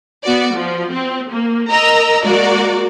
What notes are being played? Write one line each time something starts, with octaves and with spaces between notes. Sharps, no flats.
B3 F#4 D5
F3
C4
A#3
A#4 D#5 A#5 E6
G#3 A#3 F#4 A#4 D5